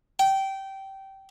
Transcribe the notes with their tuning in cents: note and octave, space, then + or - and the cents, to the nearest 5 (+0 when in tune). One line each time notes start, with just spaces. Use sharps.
G5 -20